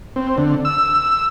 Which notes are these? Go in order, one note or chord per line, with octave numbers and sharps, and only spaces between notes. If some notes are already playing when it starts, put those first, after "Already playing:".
C4
D3
E6